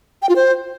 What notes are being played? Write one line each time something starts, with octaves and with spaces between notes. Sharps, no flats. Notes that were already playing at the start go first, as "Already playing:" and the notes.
G5
F4
C5